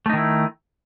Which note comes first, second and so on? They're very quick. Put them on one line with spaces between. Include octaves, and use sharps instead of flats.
A3 D#4 D#3 E4